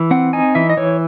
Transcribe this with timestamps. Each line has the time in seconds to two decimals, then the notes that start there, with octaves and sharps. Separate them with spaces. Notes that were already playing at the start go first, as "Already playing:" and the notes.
Already playing: E3
0.11 C4 F#5
0.33 D#4 G#5
0.55 E3 E5
0.70 D#5
0.77 E3 C#5